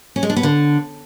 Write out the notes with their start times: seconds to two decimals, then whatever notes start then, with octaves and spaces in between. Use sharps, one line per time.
0.16 C#4
0.23 G#3
0.30 D4
0.36 B3
0.43 D3